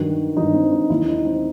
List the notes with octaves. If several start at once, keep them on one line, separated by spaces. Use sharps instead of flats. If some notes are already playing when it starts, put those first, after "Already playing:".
Already playing: G2 D#3 F#3
G2 D#3 F#3 D#4
C4
D#4
D#2 D#3 F#3 E4
D#4
C4